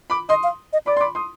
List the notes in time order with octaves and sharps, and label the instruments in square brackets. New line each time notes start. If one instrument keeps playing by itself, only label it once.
[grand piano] B5 D6
[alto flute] D#5 [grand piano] C6 D#6
[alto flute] F5
D#5
[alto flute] D5 [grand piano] B5 D6
[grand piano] C6
B5 D6
C6 D#6